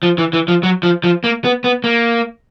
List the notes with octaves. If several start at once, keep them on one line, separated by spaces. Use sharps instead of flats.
F3
E3
E3
F3
F#3
F3
F3
A#3
B3
B3
A#3